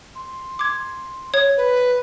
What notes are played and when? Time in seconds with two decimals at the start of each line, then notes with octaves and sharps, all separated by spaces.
0.15 C6
0.59 D6 G#6
1.34 C#5 G#6
1.57 B4